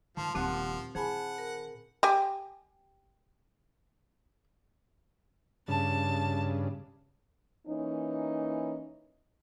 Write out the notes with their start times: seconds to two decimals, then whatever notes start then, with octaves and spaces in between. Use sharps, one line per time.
0.17 D#3 F3 A5 C6
0.35 D#1 A#2 D#3 F3 C4 G4 F#5 F#6
0.95 D#3 E4 G#4 C5 F#5 G#5 A5 B5
1.38 A#4
2.03 G4 G5 G#5
5.68 G2 C#3 A5
7.67 E3 A#3 C#4 D#4